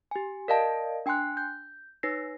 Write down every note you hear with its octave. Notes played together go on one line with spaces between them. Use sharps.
G4 G#5
A#4 D5 D#5 F5 A5
D4 G5 G#5 C6 F#6
G6
D#4 B4 C#5 A#6 C7